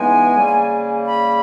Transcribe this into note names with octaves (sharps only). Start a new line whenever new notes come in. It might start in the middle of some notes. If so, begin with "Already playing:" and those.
Already playing: C#3 E3 G#3 B3 D#4 G#5
C#3 G3 A#3
B5